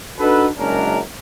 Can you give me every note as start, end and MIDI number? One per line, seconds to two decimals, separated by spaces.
0.19 0.48 62
0.19 0.48 63
0.19 0.48 66
0.19 0.48 69
0.19 0.48 71
0.58 1.00 30
0.58 1.00 42
0.58 1.00 56
0.58 1.00 61
0.58 1.00 62
0.58 1.00 70